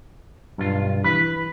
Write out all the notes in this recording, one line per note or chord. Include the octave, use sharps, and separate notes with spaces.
B1 G2 F4
E3 B4